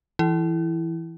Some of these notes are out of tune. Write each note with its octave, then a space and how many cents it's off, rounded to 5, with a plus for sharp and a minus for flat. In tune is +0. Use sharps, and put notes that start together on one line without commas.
E3 +10 E4 +0